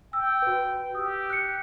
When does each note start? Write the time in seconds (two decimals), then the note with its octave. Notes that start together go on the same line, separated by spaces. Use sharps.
0.13 G5 E6
0.42 F#4 B4
0.95 G4 D#6 E6
1.30 F#6 C#7